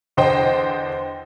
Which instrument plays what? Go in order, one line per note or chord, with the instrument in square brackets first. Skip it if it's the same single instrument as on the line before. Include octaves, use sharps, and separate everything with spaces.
[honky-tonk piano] E2 D3 C5 D#5 G5